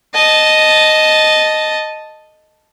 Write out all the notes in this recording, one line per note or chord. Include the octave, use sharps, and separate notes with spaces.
D#5 A5